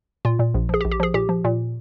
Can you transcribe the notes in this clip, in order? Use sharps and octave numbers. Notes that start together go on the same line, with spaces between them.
A#2 F4
A#2
A#1
F3 G#4
G4
A#1
G4
F3 G#4
A#2 G4
F3
A#2